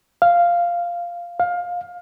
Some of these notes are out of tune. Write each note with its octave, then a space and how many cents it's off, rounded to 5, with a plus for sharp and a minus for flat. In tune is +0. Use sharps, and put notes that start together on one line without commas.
F5 -5
F5 +20